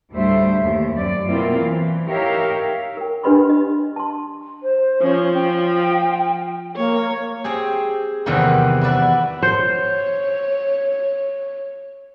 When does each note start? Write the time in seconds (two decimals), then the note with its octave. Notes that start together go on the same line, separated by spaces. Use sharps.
0.12 D2 A2 G3 A3 C5 E5
0.60 D#2 G3
0.93 F#2 D5
1.26 B2 A#3 C4 E4 F4
1.57 E3
2.06 D#4 G4 A#4 C#5 E5 F5
2.97 A#4 G5
3.24 D4 G4 B4 D#5 B5 C6
3.50 D#5
3.96 A5 C6
4.62 C5
5.02 F3 C#4
5.34 G5
6.76 A#3 C#5
7.44 C4 G4 G#4 G#5
8.26 E2 C3 D#3 E3 G3 A#3
8.81 E4 F#4 B4 D5 E5
9.43 C5 C#5